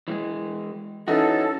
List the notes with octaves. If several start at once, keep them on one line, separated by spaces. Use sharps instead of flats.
E3 G3 G#3
E3 C#4 D#4 F#4 A4